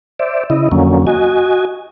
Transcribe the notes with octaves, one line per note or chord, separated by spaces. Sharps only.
C5 D5 E5
C#3 E4 D#5
F2 D3 F#3 A#3 C#4
F#4 D#5 G#5